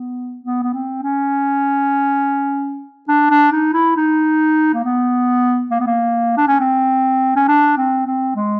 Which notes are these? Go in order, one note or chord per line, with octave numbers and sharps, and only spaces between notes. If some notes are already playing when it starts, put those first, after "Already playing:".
Already playing: B3
B3
B3
C4
C#4
D4
D4
D#4
E4
D#4
A#3
B3
A#3
B3
A#3
D4
C#4
C4
C#4
D4
C4
C4
G#3